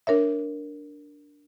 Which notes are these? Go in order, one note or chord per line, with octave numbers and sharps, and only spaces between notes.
D4 A#4 C#5 E5